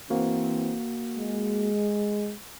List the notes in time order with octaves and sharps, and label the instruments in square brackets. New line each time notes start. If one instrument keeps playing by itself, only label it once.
[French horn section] E3 C4 [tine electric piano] A#3 F#4
[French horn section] G#3